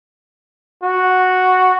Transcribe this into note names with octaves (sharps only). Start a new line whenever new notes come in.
F#4